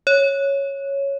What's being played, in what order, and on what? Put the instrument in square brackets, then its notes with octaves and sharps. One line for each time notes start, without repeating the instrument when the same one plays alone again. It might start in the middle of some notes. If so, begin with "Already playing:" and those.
[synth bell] C#5